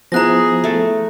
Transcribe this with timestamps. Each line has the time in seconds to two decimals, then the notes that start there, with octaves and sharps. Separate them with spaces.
0.12 F3 B3 E4 G#4 A#5 F#6 A#6
0.64 A3 A4